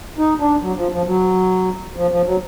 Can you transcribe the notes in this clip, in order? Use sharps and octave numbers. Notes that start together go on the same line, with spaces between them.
D#4
D4
F#3
F3
F3
F#3
F3
F3
F#3